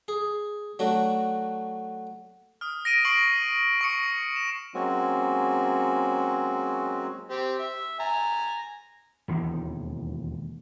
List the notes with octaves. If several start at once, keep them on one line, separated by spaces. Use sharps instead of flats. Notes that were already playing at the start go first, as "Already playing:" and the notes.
G#4
F#3 A3 D4 F#4
D#6 F6
A#6 D7 D#7
C#6 C7 D7 F#7
C#6 D#6 C#7
E7
F#3 G#3 A#3 C4 C#4 F#4
C4 G4
E5
G#5 A#5
E1 D#2 D#3 E3